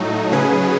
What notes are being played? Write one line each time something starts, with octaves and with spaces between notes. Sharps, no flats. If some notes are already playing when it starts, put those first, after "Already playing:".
Already playing: A2 F#3 A3 D#4
C#3 F#3 C#4 G#4 B4